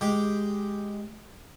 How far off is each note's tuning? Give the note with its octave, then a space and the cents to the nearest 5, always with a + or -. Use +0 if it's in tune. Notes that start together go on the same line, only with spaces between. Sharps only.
G#3 +0 G4 +0